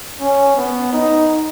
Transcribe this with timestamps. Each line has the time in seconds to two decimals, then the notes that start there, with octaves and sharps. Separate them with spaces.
0.20 C#4
0.56 B3
0.93 D#4